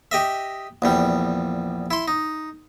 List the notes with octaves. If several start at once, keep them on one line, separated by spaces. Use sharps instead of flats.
G4 D#5 E5
A#1 E2 G3
E4 C6
D#4